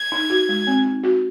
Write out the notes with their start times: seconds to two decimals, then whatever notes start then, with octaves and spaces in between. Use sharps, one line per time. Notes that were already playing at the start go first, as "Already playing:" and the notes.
Already playing: G#6
0.12 D#4
0.30 F#4
0.49 G#3
0.67 C4
0.85 D#4
1.04 F#4